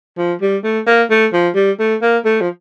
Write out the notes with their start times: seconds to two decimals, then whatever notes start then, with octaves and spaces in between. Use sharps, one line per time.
0.17 F3
0.41 G3
0.64 A3
0.86 A#3
1.10 A3
1.32 F3
1.55 G3
1.79 A3
2.02 A#3
2.25 A3
2.41 F3